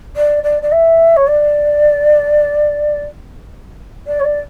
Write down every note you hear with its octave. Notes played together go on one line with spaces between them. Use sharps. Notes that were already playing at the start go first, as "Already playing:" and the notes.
D5
D5
D5
E5
C#5
D5
D5
C#5
D5